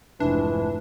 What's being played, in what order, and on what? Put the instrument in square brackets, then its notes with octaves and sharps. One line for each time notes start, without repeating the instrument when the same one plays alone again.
[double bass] F1 G#2 [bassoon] E3 [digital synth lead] D4